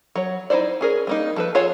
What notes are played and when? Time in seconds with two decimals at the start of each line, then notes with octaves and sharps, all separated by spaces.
0.15 F#3 C#5
0.50 D#4 E4 A4 C5 D5
0.81 C#4 G#4 A#4
1.07 G3 A#3 D#4
1.36 F3 A4 B4
1.55 F4 G#4 A4 C#5 F#5